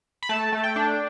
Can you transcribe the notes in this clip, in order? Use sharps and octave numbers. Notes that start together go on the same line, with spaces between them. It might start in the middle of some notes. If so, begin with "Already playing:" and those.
B5
A3 A5
A3
G5
D4